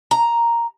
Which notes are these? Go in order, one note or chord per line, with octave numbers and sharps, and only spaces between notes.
A#5